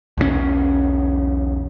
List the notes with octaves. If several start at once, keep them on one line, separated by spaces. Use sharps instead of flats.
B1 E2 E3 C#4